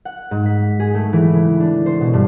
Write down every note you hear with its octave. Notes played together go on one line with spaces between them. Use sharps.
F#5
G#2
B6
G#4
A3
E3
C#3
D4
C5
B2
G2